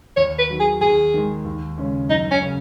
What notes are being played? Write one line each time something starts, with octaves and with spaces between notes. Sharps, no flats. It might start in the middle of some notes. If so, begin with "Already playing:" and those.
D#2 C#5
B4
D#3 F#3
G#4
D#2 G#4
D#3 G#3
D#2
C#3 G#3 C#4
F#2 D#4
C#4
C#3